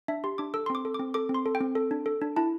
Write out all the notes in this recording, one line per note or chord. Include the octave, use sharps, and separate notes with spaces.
D4 E5
G4 C6
D4 D6
A4 E6
C6
C4 D6
A4
D6
C4
A4 D6
C4
C6
A4
G5
C4
A4
D4
A4
D4
E4 A5